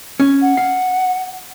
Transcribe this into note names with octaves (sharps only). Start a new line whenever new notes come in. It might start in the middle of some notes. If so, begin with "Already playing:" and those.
C#4
F#5
F5